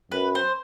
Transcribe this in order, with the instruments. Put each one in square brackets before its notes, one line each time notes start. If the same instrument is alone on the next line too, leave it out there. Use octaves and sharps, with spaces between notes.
[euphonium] F#2 [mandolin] B4
[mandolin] C5